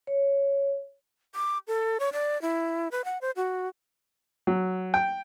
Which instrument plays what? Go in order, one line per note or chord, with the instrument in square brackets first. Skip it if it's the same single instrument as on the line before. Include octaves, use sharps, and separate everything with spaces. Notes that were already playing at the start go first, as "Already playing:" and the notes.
[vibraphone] C#5
[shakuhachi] D6
A4
C#5
D5
E4
B4
F#5
C5
F#4
[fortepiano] F#3
G5